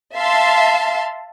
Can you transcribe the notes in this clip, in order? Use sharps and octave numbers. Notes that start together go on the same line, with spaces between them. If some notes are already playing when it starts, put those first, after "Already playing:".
E5 F5 A5 C6